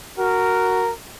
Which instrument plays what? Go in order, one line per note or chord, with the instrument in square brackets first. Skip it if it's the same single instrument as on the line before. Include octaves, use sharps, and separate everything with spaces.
[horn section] F#4 A#4